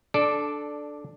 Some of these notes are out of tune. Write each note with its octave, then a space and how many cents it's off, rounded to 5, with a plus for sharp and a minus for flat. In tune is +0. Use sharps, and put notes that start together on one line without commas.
D4 +5 A4 -10 D5 +0